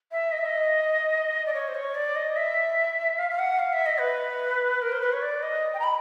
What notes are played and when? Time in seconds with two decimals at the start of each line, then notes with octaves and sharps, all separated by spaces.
0.12 E5
0.32 D#5
0.38 E5
0.46 D#5
1.46 D5
1.54 C#5
1.68 C5
1.75 C#5
1.95 D5
2.16 D#5
2.37 E5
3.18 F5
3.31 F5
3.39 F#5
3.59 F5
3.73 E5
3.86 D#5
4.00 B4
4.82 A#4
4.92 C5
5.01 B4
5.13 C#5
5.22 D5
5.42 D#5
5.74 G5
5.80 A#5
5.84 B5